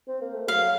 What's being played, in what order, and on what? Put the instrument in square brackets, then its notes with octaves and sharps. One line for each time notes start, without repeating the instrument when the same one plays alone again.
[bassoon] C4
A#3
A3
[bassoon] F#3 [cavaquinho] F5